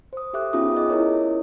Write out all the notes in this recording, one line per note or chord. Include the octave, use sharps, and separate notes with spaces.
C5 D#6
G4 A4 E5 D6 F#6
B3 C#4 D#4 F4 G#4 D#6
G#4 D#5 D6
E4 A#4 C#5